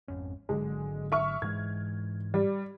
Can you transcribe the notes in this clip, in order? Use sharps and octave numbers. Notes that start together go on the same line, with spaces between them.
G#1 F2 C#4
G#1 D3 F#3 G#3
E5 C#6 F6
G#2 E3 G#3 G#6
G3